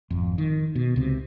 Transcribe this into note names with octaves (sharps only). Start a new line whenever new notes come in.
G#1 F2
D#3
B2
C#2 C3